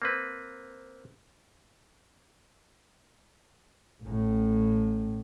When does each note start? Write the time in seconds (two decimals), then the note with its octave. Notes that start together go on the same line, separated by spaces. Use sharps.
0.02 A#3 C4 B4
4.03 A1 A2